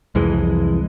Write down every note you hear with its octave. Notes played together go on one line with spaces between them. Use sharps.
C2 F2 E3 G#3